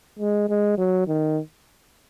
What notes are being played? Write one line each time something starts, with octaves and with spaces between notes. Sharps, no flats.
G#3
G#3
F#3
D#3